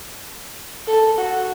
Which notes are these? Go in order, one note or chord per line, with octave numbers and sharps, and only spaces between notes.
A4
F#4